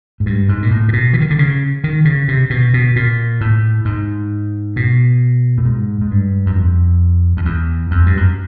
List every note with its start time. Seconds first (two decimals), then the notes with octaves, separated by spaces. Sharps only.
0.20 G#2
0.26 G2
0.49 G#2
0.62 A#2
0.71 A2
0.88 A#2
0.93 B2
1.13 E3
1.21 D#3
1.30 D3
1.39 C#3
1.84 D#3
2.05 C#3
2.28 C3
2.50 B2
2.74 B2
2.96 A#2
3.41 A2
3.85 G#2
4.76 B2
5.58 A2
5.66 G#2
6.01 G#2
6.11 G2
6.46 F#2
6.56 F2
7.37 F2
7.45 E2
7.91 F2
8.06 G2
8.17 F#2